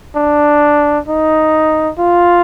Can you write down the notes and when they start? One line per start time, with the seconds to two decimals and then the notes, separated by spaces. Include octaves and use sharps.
0.16 D4
1.08 D#4
1.99 F4